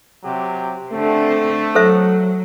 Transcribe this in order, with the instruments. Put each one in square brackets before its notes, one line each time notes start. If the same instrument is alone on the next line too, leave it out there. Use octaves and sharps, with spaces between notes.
[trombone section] C3 F#3 G4
[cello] D3 C4 [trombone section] A3
[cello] F#3 [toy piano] A4 C5 E5